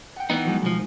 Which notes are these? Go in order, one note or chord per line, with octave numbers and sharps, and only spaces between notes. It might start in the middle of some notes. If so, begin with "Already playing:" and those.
F#5 G5
E3 B3 D#4
F3 F#3 G#3
B1 F3 G#3 D#4